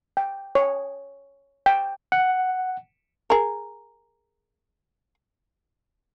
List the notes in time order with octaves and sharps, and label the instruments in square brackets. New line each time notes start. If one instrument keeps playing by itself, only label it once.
[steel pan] G5
C#5
G5
[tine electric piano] F#5
[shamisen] G#4 A#4